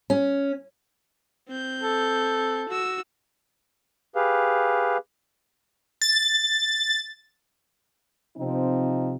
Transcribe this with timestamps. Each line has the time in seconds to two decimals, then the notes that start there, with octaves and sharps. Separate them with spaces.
0.10 C#4
1.48 C4 G6
1.82 A4
2.69 F#4 E6
4.15 G4 G#4 B4 F5
6.02 A6
8.37 C3 F3 C4 D#4